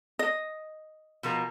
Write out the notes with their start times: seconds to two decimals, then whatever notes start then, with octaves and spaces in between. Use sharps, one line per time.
0.19 D#5
1.23 B2 F3 A#4